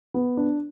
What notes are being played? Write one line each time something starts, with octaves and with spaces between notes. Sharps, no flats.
B3
D4